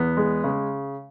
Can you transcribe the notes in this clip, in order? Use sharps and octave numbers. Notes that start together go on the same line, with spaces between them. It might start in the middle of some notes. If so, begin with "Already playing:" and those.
Already playing: E2 B3
G#3
C#3